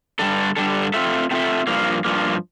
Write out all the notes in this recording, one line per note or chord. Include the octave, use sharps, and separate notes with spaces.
G2 D3 G3 D4 A4
G2 D3 G3 D4 A4
A3 C4 F4 A4 E5
A3 C4 F4 A4 E5
G2 F3 A#3
G2 F3 A#3